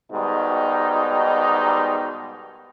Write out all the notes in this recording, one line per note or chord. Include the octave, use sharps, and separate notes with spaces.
G#2 B2 D#3 G3 D#4